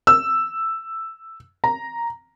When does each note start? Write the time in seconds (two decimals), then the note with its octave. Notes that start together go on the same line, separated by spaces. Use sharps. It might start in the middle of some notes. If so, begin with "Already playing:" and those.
0.07 E6
1.64 A#5